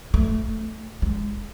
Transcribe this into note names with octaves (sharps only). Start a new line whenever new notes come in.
A3
G#3